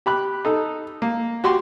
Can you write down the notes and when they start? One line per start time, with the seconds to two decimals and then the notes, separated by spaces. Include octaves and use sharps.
0.06 G4 B5 F#6
0.45 D#4 A4
1.02 A#3
1.44 F#4 G4 C6